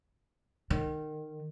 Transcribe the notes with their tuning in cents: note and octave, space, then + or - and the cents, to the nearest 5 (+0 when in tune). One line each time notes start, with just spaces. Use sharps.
D#3 -20